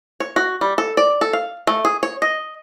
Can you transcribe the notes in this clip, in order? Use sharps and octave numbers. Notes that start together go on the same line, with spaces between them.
C#5
F#4
G3
A4
D5
A4
F5
A3
G#4
C#5
D#5